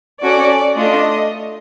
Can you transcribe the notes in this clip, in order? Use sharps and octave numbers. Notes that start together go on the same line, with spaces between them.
C#4 F#4 A4 D5
A3 D4 F4 D#5